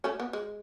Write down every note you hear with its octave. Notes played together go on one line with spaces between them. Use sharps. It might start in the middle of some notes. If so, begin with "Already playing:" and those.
A3 C#4
B3
G#3